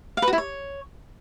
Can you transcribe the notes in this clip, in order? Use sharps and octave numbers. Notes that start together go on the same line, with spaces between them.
F5
B4
F#4
E4
C#5